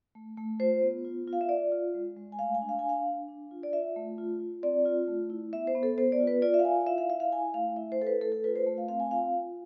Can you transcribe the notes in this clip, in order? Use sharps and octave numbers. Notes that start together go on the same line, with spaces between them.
A3
A3
F4 C5
B3
F4
F4
F5
E5
F4 D5
F4
G#3
G#3
G#5
A3 F5
G#5
D4
F5
D4 G#5
F5
D4
D4
F4
D5
F4 E5
A3
F4
F4
C4 D5
F4
A3
E4
B3 E5
C5
B3
A4
B3 C5
D5
F4
B4
F4 D5
E5
F5
F4 G#5
F5
E4 E5
F5
E4 E5
F5
E4 G#5
A3 F5
E4 E5
C5
E4 A4
B4
A3 A4
A4
F4 B4
C5
A3
F5
C4 F5
G#5
F4 F5
F4